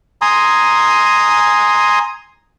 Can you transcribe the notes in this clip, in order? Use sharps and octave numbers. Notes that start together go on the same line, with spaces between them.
G#5 A#5 C6 D#6